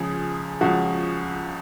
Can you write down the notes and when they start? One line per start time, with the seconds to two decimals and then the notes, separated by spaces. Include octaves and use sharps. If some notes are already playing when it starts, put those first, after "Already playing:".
Already playing: C#2 C#3 F3 G#4
0.61 C#2 C#3 F3 F#4